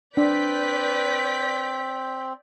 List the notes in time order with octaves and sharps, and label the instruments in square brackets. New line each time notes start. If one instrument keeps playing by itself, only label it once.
[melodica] C4 [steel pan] D4 [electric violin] B4 [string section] D5 G6 B6